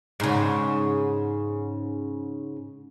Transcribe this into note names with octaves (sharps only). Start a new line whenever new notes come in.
G#2 C#3